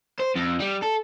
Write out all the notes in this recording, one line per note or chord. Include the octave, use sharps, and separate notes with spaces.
C5
F2
G3
A4